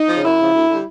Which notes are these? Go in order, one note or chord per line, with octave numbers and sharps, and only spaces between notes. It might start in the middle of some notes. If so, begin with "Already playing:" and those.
Already playing: D#4
C#3 F3
F#2 E4
C#3 F3
D2
D3 G3